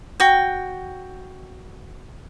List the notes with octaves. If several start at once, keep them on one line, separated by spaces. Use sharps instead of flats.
F#4 G5